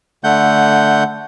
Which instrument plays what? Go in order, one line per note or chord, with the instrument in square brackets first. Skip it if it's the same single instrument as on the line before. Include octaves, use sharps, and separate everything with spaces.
[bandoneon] D3 A3 F#5 G6